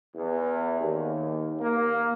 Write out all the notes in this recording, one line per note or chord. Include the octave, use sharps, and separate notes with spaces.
E2
D#2
A#3